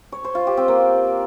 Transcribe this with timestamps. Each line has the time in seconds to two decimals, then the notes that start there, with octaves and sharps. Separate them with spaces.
0.12 C#5
0.24 C5
0.35 F4
0.47 G4
0.57 C4
0.68 A#3